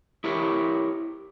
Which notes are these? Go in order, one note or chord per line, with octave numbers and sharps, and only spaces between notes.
E4 G4 A#4 C#5